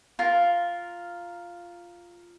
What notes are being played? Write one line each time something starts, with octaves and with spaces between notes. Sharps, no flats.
F4 A#4